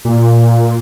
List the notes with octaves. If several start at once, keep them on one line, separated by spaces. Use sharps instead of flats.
A#2